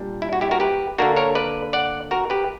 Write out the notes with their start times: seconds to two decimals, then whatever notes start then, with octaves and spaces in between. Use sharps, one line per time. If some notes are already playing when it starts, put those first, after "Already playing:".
Already playing: A#2 G3 D4
0.22 E4
0.33 F#4
0.41 E4 G4
0.51 F#4 A#4
0.60 G4 B4
0.98 D3 A#3 D4 F#4 A#4
1.16 A#4 C#5
1.35 B4 D5
1.73 D5 F#5
2.11 F#4 A#4
2.30 G4 B4